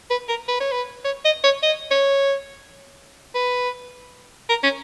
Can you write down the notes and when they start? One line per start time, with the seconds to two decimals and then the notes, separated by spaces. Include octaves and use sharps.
0.10 B4
0.28 A#4
0.48 B4
0.60 C#5
0.72 B4
1.04 C#5
1.25 D#5
1.44 C#5
1.63 D#5
1.91 C#5
3.35 B4
4.49 A#4
4.63 C#4